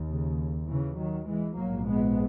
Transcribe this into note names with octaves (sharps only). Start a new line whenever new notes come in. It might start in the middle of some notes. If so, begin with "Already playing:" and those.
Already playing: D#2
C#3
C#3 E3
D#3 F#3
E3 G#3
A#1 G#2 F#3 A#3
G#3 B3